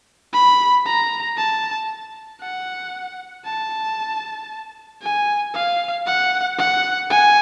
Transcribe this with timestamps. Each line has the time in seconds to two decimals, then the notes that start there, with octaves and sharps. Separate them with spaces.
0.33 B5
0.86 A#5
1.37 A5
2.41 F#5
3.45 A5
5.02 G#5
5.54 F5
6.06 F#5
6.58 F#5
7.10 G#5